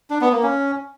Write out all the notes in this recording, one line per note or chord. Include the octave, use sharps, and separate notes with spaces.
D4
B3
A#3
C#4